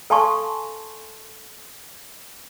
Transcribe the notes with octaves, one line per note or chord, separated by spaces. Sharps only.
A4 F5 G#5 A5 C6 C#6